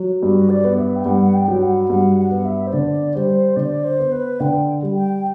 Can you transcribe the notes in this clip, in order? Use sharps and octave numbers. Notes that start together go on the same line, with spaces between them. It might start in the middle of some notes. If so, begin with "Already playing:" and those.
Already playing: F#3
G2 F#4
D5
B3
E5
G5
G2 F#5
G5
F#3
F#5
G2 F#5
F#5
B3
E5
C5
D3 D5
G3 C5
D3 D5
C5
B3
B4
D3 G5
G3
G5